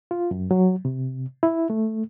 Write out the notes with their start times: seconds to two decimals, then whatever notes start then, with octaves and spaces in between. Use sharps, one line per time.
0.11 F4
0.31 F#2
0.51 F#3
0.85 C3
1.43 E4
1.70 A3